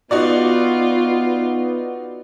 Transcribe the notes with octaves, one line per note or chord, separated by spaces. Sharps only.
B3 D#4 F4 F#4 D5